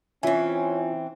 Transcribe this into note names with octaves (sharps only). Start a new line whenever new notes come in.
E3 C4 C#4 F4 G#5